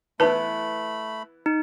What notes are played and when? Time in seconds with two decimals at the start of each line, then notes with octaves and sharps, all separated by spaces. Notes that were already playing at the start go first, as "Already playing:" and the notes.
0.20 E3 A3 B3 E4 B4 A5 B5
1.46 D#4